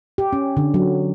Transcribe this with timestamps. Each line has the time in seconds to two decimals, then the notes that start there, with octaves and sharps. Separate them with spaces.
0.18 G4
0.33 C#4
0.57 D3
0.74 F#3